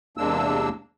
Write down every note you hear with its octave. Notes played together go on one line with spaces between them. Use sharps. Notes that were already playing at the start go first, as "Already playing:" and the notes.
E2 C3 G#3 A#3 D4 E6